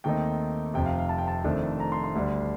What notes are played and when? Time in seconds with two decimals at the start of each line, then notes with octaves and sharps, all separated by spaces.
0.04 D#2 D#3 A3 C4 D#4 G5
0.74 F1 F2 C3 G5
0.86 F5
0.99 F5
1.09 A5
1.18 G5
1.28 A5
1.44 F1 F2 D#3 A3 D4
1.80 A#5
1.92 C6
2.04 C6
2.15 D2 D3 G3 D4